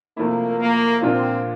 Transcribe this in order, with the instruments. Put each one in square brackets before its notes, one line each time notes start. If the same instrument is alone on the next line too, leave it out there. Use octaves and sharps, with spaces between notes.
[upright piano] C3 F3 A3 E4 [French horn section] A#3
[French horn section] A#3
[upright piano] A#2 F3 A#3 D4 F4 [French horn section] C4